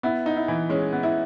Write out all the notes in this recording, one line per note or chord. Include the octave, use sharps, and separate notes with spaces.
B3 E4
D#4
E4
E3
G#3 C#4
B3
E4